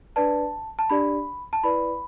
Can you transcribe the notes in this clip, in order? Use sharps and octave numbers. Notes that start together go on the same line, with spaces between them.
D4 B4 D5 A5
A5
D4 G4 D5 B5
A5
E4 B4 D5 B5